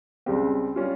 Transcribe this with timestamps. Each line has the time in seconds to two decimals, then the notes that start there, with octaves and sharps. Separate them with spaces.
0.26 C#2 C#3 G3 C4 G4
0.76 G3 C#4 F4